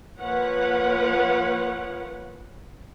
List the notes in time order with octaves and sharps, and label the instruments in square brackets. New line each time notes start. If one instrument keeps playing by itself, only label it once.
[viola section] F3 A#3 B4 C#5 F#5